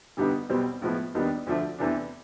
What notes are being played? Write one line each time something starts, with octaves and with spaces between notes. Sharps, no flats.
G2 D3 G3 B3 D#4
B1 B2 G3 C4
A2 F3 G#3 B3
D#2 D#3 G3 B3 D4
D2 D3 F3 A3
E2 C3 E3 A3 D4